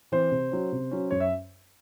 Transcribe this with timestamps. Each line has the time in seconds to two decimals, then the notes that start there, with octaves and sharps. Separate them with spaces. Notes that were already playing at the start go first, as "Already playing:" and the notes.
0.12 E3 C4 C5
0.31 C3
0.51 F#3 C#4
0.72 C3
0.91 F#3 C#4
1.11 F#2 C#5
1.20 E5